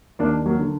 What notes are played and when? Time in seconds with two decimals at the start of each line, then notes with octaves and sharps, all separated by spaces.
0.19 D#2 A#3 D4
0.46 F#3 A#3
0.59 D3